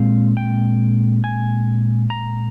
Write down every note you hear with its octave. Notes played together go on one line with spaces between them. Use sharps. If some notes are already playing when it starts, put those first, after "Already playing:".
Already playing: A#2 G#3 C4 F5
G5
G#5
A#5